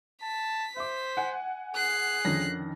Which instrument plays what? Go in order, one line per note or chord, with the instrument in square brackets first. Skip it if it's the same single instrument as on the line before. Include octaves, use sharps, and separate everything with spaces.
[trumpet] A5 [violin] B6
[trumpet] C5 [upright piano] E5 D6
[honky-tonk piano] F#5 G#5
[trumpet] G#4 [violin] F#6 C7
[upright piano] F2 D3 C#4 [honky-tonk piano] D#3 A#6